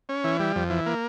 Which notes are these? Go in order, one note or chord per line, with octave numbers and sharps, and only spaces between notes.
C#4
E3
G3
F2
E3
A#3